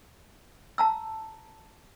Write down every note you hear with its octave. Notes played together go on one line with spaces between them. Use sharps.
A5 A#5 E6